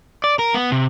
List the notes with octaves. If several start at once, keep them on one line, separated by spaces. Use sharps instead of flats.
D5
A#4
B3
C3